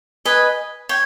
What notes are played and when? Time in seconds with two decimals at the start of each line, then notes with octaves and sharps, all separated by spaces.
0.25 B4 D#5 G#5
0.89 C#5 G5